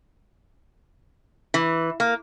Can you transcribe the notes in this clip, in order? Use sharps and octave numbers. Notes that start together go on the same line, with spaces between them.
E3
A#3